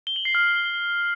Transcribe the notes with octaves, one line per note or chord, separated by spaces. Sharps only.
G7
F#7
C7
F6